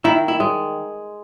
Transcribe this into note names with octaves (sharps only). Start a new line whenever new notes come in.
D#3 E4
E4
G#3